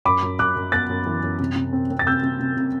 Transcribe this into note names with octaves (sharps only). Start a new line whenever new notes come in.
F#2 B5 D6
F#2
F#2 D6 F#6
F#2
B3 F#6 A6
F#2
E3
F#2
C3
C3
C4
C4
A6
C3 E6 G6
C3
C3
C3